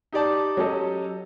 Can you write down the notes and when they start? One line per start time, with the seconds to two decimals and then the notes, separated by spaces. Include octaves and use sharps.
0.13 D#4 G4 D5 A5
0.57 F#3 C#4 G4 A4 D#5